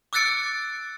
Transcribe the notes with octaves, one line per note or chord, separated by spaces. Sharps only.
D6 E6 F#6 A6 C#7 D7